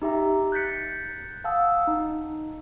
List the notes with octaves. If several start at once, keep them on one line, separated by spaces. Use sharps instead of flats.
D#4 G4 E5 A#5
F#6 G6 A6 B6 C#7
F5 F#5 A5 D#6 E6
D#4